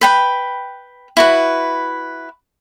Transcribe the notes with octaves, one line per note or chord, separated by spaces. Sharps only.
B4 G5 B5
E4 F#4 B4